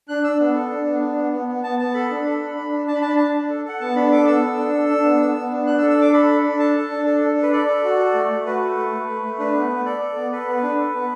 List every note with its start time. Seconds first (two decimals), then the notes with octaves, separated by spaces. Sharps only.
0.09 D4 F#6
0.24 D4 E6
0.40 B3
0.55 A4
0.70 D4
0.87 B3
1.01 D4
1.17 B3
1.32 B3
1.48 B3
1.64 B3 A5
1.79 B3 A5
1.94 A4 B5
2.10 D4
2.26 A4
2.41 D4
2.57 D4
2.72 D4
2.88 D4 A5
2.94 B5
3.02 D4 A5
3.09 B5
3.16 D4 A5
3.34 D4
3.49 A4
3.65 A4 F#5
3.81 B3 A5
3.95 D4 B5
4.12 A4 D6
4.27 B3 E6
4.43 A4
4.58 D4
4.74 A4
4.89 D4
5.05 B3
5.20 B3
5.35 B3
5.51 D4
5.67 D4 F#6
5.79 E6
5.82 A4
5.90 E6
5.98 D4 D6
6.13 A4 B5
6.29 D4
6.44 D4
6.59 A4 A5
6.75 A4
6.91 D4
7.06 A4
7.21 D4
7.37 A4
7.43 B4
7.53 A4 D5
7.68 A4
7.84 F#4
7.99 A4
8.14 A3
8.30 A3
8.46 F#4 B4
8.61 A4
8.77 A3
8.92 A3
9.08 A3
9.24 A3
9.39 D4 B4
9.54 B3
9.70 B3
9.85 A4 D5
10.01 A4
10.16 B3
10.32 A4 B4
10.48 B3
10.63 D4
10.79 A4
10.94 B3